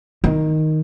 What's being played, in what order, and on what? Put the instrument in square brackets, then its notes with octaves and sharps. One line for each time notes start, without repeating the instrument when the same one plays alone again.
[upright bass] D#3